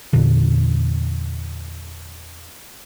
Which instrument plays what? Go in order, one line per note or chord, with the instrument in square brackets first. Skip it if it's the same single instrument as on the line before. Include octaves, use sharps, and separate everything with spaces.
[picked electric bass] E2 A#2 D3